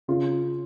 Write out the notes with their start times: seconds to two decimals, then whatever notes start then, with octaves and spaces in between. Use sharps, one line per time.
0.08 C#3 F4